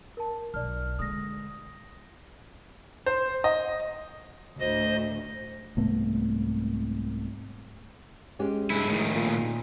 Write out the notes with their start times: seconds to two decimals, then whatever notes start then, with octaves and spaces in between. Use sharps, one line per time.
0.17 A#4 A5
0.54 B1 D5 F6
0.99 D3 G#3 D#6 A#6
3.06 C5
3.44 D#5
4.60 D2 A2 C5 D#5
5.77 C2 G#2 A3 B3
8.39 G#3 C#4 G4
8.70 G2 G#3 E4
8.87 A2 D#3
9.14 A#2 F4 F5